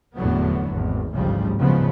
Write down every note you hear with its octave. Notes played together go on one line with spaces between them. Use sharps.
F1 E2 A2 D3 F#3 B3
G#1 E2
A1 D2 G#2 C#3 F3 G3
F#1 G#2 C#3 F3 G#3 B3